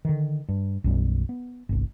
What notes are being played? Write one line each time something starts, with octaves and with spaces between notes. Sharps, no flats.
D3 D#3
G2
B1 F#2 G3
B3
G1 C2